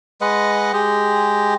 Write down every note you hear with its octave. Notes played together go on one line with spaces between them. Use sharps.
G#3 B4 D#5 F#5
G#3 G4 G#4